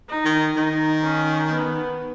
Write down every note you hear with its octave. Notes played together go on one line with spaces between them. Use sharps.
D#4
D#3
D#3 D#4
C#4
B3